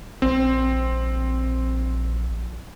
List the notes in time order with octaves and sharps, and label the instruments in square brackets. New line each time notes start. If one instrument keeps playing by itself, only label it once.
[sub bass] A#1 [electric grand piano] C4